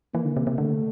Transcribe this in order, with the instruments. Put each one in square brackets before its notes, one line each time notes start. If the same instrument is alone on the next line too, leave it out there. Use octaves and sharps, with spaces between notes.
[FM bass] E3 [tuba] A#3
[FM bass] D3
C3
C3
[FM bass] D3 [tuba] A3